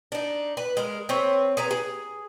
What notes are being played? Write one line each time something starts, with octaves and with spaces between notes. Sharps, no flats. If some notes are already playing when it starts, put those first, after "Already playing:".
D4 D#4
B4
G#3 A#4
C4 B4 C#5
G#4 B4 A#5
G#4